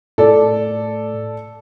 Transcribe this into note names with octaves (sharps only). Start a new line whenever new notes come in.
A2 A4 D5